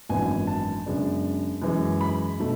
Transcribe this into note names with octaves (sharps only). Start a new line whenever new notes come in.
G#1 F#2 E3 B3 D4 G#5
A5
F#2 C#3 G#3 B3 D4
F#2 E3 G#3
B5
B2 A3